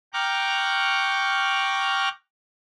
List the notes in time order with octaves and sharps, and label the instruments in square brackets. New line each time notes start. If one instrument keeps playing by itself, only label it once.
[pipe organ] G5 A#5 C#6 D6 F6 F#6